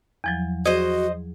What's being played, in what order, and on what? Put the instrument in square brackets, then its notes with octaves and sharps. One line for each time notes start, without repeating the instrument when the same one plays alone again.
[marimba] E2 F3 F#3
[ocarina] F#4 [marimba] G#4 [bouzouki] C5 D#5